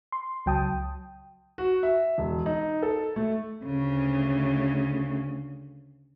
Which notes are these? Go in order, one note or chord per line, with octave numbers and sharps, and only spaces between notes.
C6
C#2 F#3 G5 A5 D#6
F#4
E5
E1
D#4
A4
A3
D2 C#3